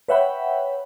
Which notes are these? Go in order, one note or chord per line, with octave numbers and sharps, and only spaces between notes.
B4 C#5 E5 F#5 G5 B5